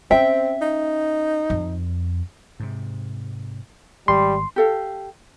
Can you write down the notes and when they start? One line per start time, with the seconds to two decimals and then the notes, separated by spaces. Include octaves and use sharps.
0.11 C4 C#4 E5 G5
0.61 D#4
1.50 F2
2.60 G#2 C3
4.08 G#1 G3 C6
4.56 G4 A4 F5